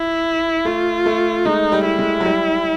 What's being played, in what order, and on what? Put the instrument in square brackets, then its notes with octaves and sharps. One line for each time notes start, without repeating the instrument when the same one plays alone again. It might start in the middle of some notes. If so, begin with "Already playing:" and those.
Already playing: [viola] E4
[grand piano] A3 [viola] F4
[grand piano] A3
[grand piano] G#3 [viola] D#4
[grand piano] G3
[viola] E4
[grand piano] G#3
F#3
G3